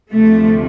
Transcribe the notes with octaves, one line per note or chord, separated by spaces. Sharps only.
D2 C3 F3 A3